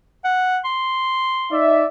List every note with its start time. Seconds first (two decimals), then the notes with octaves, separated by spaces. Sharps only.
0.25 F#5
0.65 C6
1.52 D#4 D5 E5